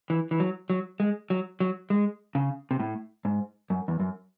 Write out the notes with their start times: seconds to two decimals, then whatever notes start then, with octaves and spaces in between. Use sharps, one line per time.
0.10 E3
0.31 E3
0.40 F#3
0.70 F#3
1.00 G#3
1.30 F#3
1.60 F#3
1.90 G#3
2.35 C#3
2.71 C3
2.80 A2
3.25 G#2
3.70 F#2
3.88 E2
4.00 F#2